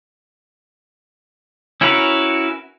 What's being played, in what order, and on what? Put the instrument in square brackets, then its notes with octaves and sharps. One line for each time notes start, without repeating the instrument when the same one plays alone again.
[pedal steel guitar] C#4 E4 F#4 A#4 B4